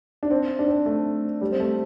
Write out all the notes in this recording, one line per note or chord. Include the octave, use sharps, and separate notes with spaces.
D4
C4
D4
C4
A3
G3
C4
A3